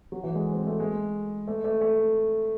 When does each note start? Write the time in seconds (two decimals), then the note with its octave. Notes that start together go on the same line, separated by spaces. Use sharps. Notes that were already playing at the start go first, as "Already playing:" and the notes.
0.12 F#3
0.23 E3
0.35 G#3
0.53 C4
0.67 A3
0.79 G#3
1.47 A3
1.64 A3
1.81 A3